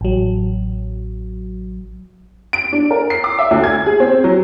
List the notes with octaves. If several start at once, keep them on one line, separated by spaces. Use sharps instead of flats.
A1 F#3
D7
D4
A#4
C7
D6
E5
D2
G#6
G#4
C4
F#3